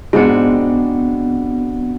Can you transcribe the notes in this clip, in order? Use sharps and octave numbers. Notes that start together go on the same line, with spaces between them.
G#2 G#3 B3 C4 D4 F#4